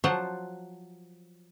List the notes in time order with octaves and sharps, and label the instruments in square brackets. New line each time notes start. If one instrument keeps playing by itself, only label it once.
[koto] F3 F#3 C5 F#5 A5